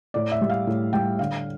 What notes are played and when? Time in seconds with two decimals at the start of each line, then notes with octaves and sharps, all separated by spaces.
0.14 A2 D5
0.32 E5
0.41 G3
0.50 F5
0.67 A2
0.93 G3 G5
1.19 D3 F5